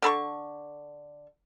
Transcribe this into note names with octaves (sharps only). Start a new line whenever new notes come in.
D3 A4 B5 C#6